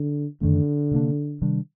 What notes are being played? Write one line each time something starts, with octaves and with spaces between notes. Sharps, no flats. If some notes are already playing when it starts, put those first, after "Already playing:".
Already playing: D3
F#2 D3 D#3 A3
C3 G3 A#3 D4
C3 D#3 G3 D4